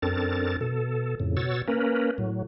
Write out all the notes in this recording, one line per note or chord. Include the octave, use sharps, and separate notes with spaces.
F#2 C4 D4 A4 A#4 A6
B2 A4
F2 A2 C#3
B2 F#4 C#5 E6 A6
A#3 C#4 A#4 B4
A2 F#3